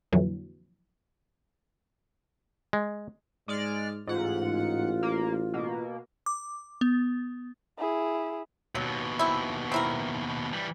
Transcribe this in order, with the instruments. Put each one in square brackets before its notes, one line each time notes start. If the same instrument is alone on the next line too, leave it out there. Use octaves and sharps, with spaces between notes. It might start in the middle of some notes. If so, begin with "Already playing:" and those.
[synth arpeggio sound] F2 A#2 D3 E3 F#3
[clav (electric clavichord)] G#3
[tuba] G#2 [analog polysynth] G#3 D5 F6
[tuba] A1 [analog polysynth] G#2 F#5 [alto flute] F4
[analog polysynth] A#3
B2 A#3
[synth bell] D6
B3
[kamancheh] E4 G#4
[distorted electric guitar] D#2 B2 [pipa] F#3
[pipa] C4 E4
C4 E4 A#4
[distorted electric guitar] E3 G3